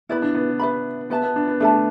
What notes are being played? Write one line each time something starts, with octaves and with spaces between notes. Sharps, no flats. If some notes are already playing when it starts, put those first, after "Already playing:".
B3 E4 B4 D5 B5
D4
B3
B4 E5 B5
B3 B4 E5 A5
B3
D4
B3
A3 D4 A4 E5 A5